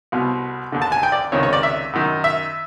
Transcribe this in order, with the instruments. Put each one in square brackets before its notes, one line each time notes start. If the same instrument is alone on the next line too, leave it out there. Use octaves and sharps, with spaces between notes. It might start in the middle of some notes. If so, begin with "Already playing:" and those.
[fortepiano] C2 B2
D#2 D3
A5
G#5
G5
D5
C#2 C3 D#3 C#5
C#5
D5
E5
F#2 D#3
E5